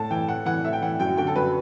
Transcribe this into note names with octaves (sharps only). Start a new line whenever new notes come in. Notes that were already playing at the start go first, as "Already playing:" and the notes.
Already playing: A2 A5
E3 G5
A2 F#5
E3 F#5
A2 E5
G5
E3 F#5
F#2 G5
D3 G5
A4
F#2 B4